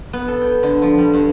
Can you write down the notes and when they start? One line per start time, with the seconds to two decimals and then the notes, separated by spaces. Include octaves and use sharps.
0.13 B3
0.28 A4
0.41 G5
0.63 D3
0.82 F3
0.98 G3
1.14 G2